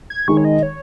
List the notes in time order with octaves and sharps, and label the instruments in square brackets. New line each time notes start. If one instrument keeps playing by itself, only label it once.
[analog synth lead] G#6
[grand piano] D#3 G#3 D#4 G#4 [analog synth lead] C#6
[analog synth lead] C#5
D#5
C#5